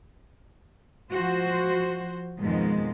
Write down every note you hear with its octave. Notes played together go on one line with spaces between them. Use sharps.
F3 F#4 C5
F2 G#2 B2 D#3 F3 G#3